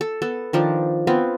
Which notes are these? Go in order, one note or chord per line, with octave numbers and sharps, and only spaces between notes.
A4
B3 A4
D#3 F3 D4
B3 C4 F4